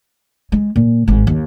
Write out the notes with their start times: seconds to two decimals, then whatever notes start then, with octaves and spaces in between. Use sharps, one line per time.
0.52 G#3
0.76 A#2
1.08 G#1 G#2
1.27 D#2